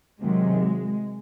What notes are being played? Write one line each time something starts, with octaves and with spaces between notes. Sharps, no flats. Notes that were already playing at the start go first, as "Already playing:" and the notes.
C3 D#3 F#3 G#3